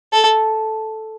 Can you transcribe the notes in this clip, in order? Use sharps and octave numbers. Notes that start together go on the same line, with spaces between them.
A4